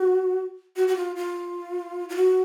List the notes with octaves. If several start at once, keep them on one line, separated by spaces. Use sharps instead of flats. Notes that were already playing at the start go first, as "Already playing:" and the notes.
Already playing: F#4
F#4
F#4
F4
F4
F4
F#4